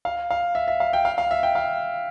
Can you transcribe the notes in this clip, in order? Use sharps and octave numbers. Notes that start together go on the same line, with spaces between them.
F5
F5
E5
E5
F5
G5
F5
F5
E5
G5
F5